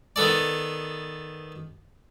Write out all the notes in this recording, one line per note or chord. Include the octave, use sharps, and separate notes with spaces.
D#3 B3 A4 D5